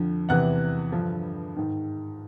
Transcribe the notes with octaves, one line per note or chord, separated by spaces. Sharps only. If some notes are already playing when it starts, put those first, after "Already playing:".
Already playing: F2 D3 F3
E2 C3 E3 F#5 F#6
G2 D3 F3
G#2 D#3